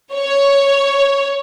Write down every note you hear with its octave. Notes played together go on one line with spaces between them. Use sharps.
C#5